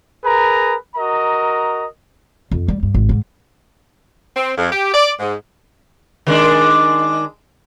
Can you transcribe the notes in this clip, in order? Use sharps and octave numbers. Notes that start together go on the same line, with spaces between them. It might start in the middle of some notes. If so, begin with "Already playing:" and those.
G#4 A#4 B4 A#5
F#4 A#4 D#5 A#5
F2
G3
G2
G#1
G#2
C4
F2
G4
D5
G#2
D#3 G#3 D4